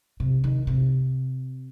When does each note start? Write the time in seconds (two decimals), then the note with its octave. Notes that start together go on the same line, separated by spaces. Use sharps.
0.20 C3
0.44 D#3
0.67 C3